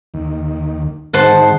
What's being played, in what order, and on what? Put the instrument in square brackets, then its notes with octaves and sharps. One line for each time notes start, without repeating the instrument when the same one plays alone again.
[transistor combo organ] D#2
[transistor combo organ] G#2 D#3 [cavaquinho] C5 F#5 A5